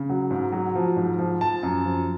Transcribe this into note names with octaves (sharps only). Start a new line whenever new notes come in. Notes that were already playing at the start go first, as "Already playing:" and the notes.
Already playing: C#3
F#3
G#2
F#3
F3
G#2
F3
F3 A5
F#2
F3